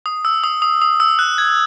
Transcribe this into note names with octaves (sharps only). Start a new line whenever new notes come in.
D#6
E6
D#6
D#6
D#6
E6
F#6
G#6